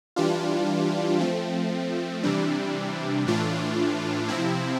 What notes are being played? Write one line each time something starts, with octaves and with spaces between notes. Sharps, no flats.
E3 G3 D4 F4
F3 A3 C4
C3 E3 G3 D4
A2 E3 A3 D4 F4
C3 F3 C4 E4